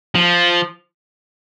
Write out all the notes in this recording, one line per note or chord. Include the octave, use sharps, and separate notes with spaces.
F3